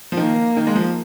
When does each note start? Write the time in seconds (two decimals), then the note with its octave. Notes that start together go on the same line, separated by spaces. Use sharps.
0.12 F3
0.17 D#3 A#3
0.57 D#3
0.67 G#3
0.75 F3